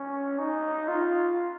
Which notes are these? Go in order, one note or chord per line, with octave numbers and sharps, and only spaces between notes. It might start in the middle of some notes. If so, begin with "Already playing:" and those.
Already playing: C#4
D#4
F4